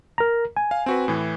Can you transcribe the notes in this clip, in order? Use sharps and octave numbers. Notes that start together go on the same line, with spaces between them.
A#4 A#5
G#5
F5
C4 F#4 B4
A2 E3